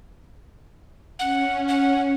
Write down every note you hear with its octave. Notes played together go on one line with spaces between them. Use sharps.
C#4 F#5
F#5